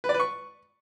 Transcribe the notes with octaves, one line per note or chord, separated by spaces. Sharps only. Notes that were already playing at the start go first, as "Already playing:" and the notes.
B4
D5
B4
C#6